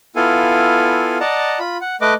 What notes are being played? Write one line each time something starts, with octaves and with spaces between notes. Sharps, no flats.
B3 E4 F4 A4 F5 G#5
D5 D#5 F#5 A5 A#5
F4 B5
F#5
A3 B4 D#5 D6